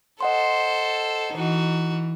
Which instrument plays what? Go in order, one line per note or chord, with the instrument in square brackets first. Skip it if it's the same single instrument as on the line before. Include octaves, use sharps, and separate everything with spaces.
[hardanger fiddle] A4 C5 [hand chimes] D#5 F#5 C6
[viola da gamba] E3 [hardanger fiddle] D#4 F#4